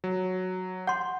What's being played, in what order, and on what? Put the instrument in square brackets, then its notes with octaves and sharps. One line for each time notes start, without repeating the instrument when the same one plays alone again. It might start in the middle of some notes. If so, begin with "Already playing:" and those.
[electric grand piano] F#3
[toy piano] F#5 C6 [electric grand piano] G6